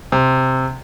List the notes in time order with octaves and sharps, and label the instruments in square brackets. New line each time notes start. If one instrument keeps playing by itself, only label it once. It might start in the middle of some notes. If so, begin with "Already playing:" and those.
[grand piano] C3